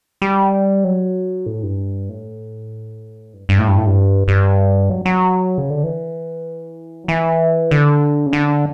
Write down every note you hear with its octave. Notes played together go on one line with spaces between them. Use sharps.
G3
F#3
A2
G2
A2
G2
G2
A2
G2
A2
G2
G2
F#3
F#3
C#3
D3
E3
F#3
E3
D3
C#3
D3